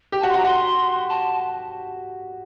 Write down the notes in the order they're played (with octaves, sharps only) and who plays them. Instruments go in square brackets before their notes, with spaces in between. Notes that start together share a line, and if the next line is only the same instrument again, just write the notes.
[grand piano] G4
[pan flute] A5
[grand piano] F#4
[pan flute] C6
[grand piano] F#4
[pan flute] A#5
[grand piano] F#4 [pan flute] C6
[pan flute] A5